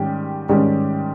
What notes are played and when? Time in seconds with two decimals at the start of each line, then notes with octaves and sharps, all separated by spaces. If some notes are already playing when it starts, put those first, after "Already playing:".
Already playing: G#2 D#3 G3 C#4 G4
0.49 G#2 D#3 G3 C#4 G4